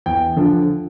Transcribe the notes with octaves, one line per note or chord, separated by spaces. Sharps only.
E2 G5
D3 F3